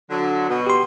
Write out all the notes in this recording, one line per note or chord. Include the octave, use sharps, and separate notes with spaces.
D3 F#3
B2
G4 C6